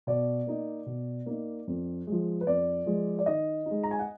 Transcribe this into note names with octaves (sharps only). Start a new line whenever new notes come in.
B2 D5
A#3 D#4
B2
A#3 D#4
F2
F3 G#3
B4
F2 D5
F3 G#3
D5
D#3 D#5
D#4
G#3
A#5
G#5
F#5